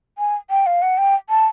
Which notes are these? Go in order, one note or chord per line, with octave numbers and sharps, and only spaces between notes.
G#5
G5
F5
F#5
G5
A5